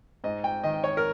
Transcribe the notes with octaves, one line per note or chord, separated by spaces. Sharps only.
G#2 D#5
G5
D#3 D#5
C#5
A#4